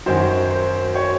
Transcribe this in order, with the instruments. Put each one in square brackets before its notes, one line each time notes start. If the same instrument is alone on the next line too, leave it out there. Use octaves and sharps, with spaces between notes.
[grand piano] F#2 D#3 F#3 C5
C5
C#5